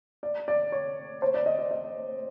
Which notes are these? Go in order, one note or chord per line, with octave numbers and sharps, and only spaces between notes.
D5
D5
C#5
C5
D5
D#5
D5
D#5